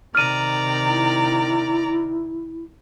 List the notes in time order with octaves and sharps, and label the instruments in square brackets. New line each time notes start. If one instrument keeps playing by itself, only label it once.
[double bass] C3 D#3 [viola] D5 A#5 [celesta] F6 D#7
[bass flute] E4